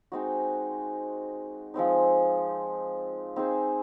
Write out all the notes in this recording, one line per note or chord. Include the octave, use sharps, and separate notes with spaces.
G#3 C4 D#4 F#4
F3 G#3 C4 D#4
C4 D#4 G#4 C5